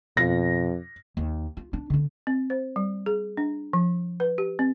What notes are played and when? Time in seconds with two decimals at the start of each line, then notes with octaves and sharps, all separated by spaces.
0.17 F2 B2 F4 A#6
1.17 D#2
1.57 F4
1.73 D4
1.90 D3 D4
2.27 C4
2.50 C5
2.76 G3
3.06 G#4
3.37 D4
3.73 F3
4.20 B4
4.38 G4
4.59 C4